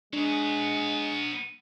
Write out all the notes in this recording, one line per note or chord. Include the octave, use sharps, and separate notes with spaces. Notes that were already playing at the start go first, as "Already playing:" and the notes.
F#3 G#3 B3 D4